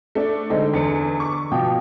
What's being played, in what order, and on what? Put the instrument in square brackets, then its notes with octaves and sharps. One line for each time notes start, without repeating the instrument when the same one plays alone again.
[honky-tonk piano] A3 D4
[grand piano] D3 [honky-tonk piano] G#3 C4 D#4
[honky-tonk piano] E2 C#7
C#6 D6
[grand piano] B2 F3 G5